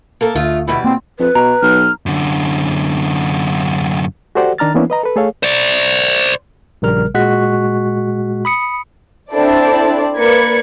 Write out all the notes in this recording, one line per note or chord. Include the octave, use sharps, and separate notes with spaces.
A#3 A4 A#4
D2 A3 F4 D#5
B2 E3 G3 E4
A#3 C4
F2 B4
B2 A#5
B1 F6
F#2 D3
F#4 G4 A4 C5 D5 F#5
D#3 D4 A#5 F6 A6
E3 A#3 B3 C#4 D4 E4
B4 D#5 A#5
A4 B4
A3 G#4 A4 C#5 F5
C5 D5
A#1 C#3 G3 A#4 F6
A#2 G#3 F#4 C#6 F#6 B6
B5 D#6 C#7
C4 D4 E4 A4 C5 D5
A#3 B4 D5 G#6 C#7